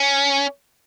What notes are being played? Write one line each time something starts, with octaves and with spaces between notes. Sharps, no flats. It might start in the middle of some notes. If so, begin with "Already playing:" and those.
Already playing: C#4